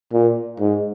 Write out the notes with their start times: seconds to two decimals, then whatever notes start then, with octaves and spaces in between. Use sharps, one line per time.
0.13 A#2
0.60 G#2